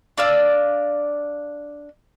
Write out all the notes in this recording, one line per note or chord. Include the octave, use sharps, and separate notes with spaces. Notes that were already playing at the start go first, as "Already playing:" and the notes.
D4 D5 F5 E6